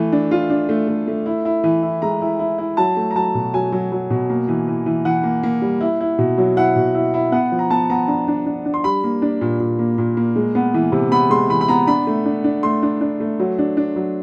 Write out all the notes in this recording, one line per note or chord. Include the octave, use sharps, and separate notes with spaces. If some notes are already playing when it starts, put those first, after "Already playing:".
Already playing: E3 A3
D4
F4
D4
A3
A3
A3
E4
E4
E3
E4
G#3 A#5
E4
E4
E4
F#3 A5
A3
A#5
F#3 A5
B2
F#3 G#5
F#3
F#3
B2
A#3
E3
E3
E3
E3 F#5
A#3
A#3
G3
E4
E4
B2
F#3
E4 F#5
B2
E4
E4
B3 F#5
F3
A#5
B3 A5
B3 A#5
D4 A#5
D4
D4
D4
C6
G3 B5
A#3
D4
A#2
A#2
A#3
A#2
A#3
G#3
B3
E3
C3
B3 B5
G#3 C6
E3 B5
B5
B3 A#5
D4 B5
A3
D4
D4
A3 C6
D4
D4
A3
F#3
D4
D4
F#3